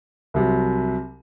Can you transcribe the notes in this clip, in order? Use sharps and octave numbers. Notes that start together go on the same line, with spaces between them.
C2 C3 F#3